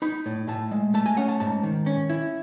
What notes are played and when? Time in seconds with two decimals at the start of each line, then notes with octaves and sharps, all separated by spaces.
0.02 D#4 B5
0.26 A2
0.48 A2 A5
0.71 G#3
0.94 A3 A5
1.06 G#5
1.17 C#4 F#5
1.29 A5
1.40 G#2 A5
1.63 D#3
1.86 C#4
2.09 E4